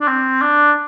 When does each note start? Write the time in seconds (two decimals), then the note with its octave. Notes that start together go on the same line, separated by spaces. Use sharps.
0.01 D4
0.08 C4
0.41 D4